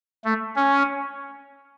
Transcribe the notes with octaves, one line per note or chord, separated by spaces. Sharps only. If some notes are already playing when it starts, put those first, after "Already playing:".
A3
C#4